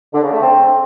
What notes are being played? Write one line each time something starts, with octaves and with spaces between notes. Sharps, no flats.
D3
C#3
A3
C4